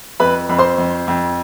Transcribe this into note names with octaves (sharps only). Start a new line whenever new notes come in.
F2 B4 B5
F2 B5
C5 C6
F2
F2